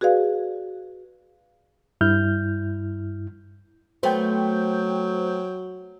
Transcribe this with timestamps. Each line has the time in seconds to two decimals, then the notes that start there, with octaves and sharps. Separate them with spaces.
0.01 F#4 G#4 B4 D5 F5
2.01 G2 E4 F6 G6
4.03 F#3 A3 B3 C5 G5 G6